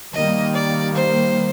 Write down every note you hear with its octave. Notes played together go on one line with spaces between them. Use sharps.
D#3 G3 A#3 D#5
D5
C5